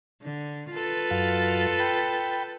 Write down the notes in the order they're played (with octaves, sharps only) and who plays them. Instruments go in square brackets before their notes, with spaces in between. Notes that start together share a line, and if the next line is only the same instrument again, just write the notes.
[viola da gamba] D3
F4 A4 B4
[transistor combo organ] F#2 F5
G5 B5